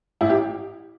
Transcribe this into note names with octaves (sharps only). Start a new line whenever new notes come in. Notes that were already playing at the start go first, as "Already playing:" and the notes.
A1 E4
G4